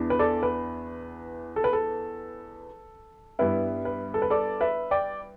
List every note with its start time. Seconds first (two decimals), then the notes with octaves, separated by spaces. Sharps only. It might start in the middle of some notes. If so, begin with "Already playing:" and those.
Already playing: E2 E3 B3 D4
0.10 B4
0.19 A4 D5
0.43 B4
1.56 A4
1.64 B4
1.73 A4
3.39 G2 G3 B3 E4 B4
3.85 B4
4.14 A4
4.22 B4
4.30 A4 D5
4.61 B4 E5
4.91 D5 G5